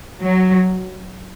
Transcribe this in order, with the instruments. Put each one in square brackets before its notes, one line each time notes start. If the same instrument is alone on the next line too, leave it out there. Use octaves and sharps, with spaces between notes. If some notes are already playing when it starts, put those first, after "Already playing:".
[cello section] F#3